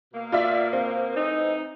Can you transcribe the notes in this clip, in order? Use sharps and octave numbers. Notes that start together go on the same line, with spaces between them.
B2 A#3
F4 D5 E5
C4
E3 A3 D#4